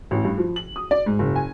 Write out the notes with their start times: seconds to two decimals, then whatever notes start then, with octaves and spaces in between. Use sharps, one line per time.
0.11 A1
0.25 G2
0.38 F3
0.56 F#7
0.76 D#6
0.91 D5
1.06 G#2
1.19 F#1
1.36 G#5